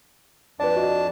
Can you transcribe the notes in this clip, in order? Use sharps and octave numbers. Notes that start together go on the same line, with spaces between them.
F2 D4 B4 D5 A5
F#4 D#5